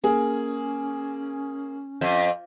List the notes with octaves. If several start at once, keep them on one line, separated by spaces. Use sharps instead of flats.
A#3 C#4 G#4
F2